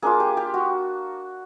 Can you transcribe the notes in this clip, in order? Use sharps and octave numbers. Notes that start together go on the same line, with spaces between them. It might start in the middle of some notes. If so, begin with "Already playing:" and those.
A#3 D4 F4 G#4
G4
G4
F#4